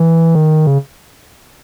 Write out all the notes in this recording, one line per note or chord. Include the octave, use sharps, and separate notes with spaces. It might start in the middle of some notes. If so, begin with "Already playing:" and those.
Already playing: E3
D#3
C#3